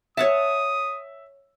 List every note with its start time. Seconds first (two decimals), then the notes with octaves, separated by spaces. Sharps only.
0.17 C#5 E5 F#5 A5 D#6